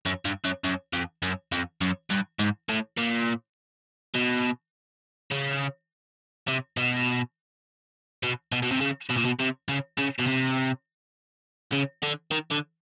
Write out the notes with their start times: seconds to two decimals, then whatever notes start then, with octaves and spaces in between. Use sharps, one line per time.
0.06 F#2
0.25 G2
0.45 F#2
0.64 F#2
0.93 F2
1.23 F#2
1.52 F2
1.81 F#2
2.10 G2
2.39 G#2
2.69 A2
2.98 A#2
4.15 B2
5.31 C#3
6.48 C3
6.77 B2
8.23 B2
8.52 B2
8.63 B2
8.72 C3
8.81 C#3
9.10 B2
9.17 A#2
9.26 B2
9.40 C3
9.69 C#3
9.98 C#3
10.19 B2
10.27 C3
11.72 C#3
12.03 D3
12.31 D#3
12.51 D3